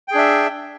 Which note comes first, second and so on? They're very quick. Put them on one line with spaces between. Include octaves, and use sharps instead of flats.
G5 G#4 D4 E5